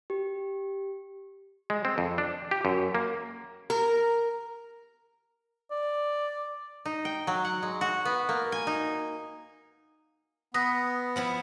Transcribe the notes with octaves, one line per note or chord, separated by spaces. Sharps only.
G4
G#3
C4
F2
D4
G4
F#2
A#3
A#4
D5
D#4
G5
F#3
F#5
G#3
F#4
B3
A#3
G#5
D#4
B3 B4 D#6 A#6
F3 B3 E4